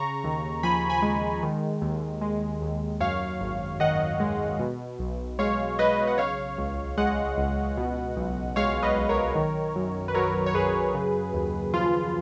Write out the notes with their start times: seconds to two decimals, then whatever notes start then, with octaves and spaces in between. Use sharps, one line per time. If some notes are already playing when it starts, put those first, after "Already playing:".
Already playing: C#3 A#5 C#6
0.24 D#2
0.63 F3 G#5 B5
0.90 G#5 B5
1.02 G#3
1.43 D#3
1.82 D#2
2.21 G#3
2.61 D#2
3.00 F#2 C#5 F5
3.41 G#1
3.80 D#3 D#5 F#5
4.20 G#3
4.60 B2
4.99 B1
5.39 G#3 C#5 F5
5.79 B1 B4 D#5
6.07 F#5
6.18 C#3 C#5 F5
6.58 C#2
6.97 G#3 D#5 F#5
7.38 C#2
7.77 B2
8.16 B1
8.56 G#3 C#5 F5
8.83 B4 D#5
8.96 B1
9.09 A#4 C#5
9.35 D#3
9.76 F#2
10.08 B4
10.14 F#3 A#4 C#5
10.46 C#5
10.54 F#2 G#4 B4
10.94 C#3
11.33 D#2
11.74 F3 F4